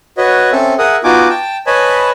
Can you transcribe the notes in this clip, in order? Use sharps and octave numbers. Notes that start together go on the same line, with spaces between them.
F#4 B4 C#5 D#5
C4 C#4 A4 E5
G#4 A#4 E5 F#5 D#6
B3 D#4 F4 F#4 G#5 D6
G5 A5
B4 C#5 D#5 G#5 A5 B5